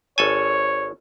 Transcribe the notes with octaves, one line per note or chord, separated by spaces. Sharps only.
G#1 A4 C#5 G#5